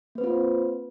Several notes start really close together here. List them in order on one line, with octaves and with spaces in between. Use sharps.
A#3 B4 C4 F4 C5